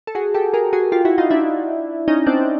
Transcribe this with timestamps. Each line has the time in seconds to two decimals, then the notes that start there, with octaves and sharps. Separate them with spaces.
0.07 A4
0.15 F#4 G#4
0.34 G4 A4
0.54 G#4 A#4
0.73 F#4 G#4
0.92 F4 G4
1.05 E4 F#4
1.18 D#4 F4
1.30 D4 E4
2.08 C#4 D#4
2.27 C4 D4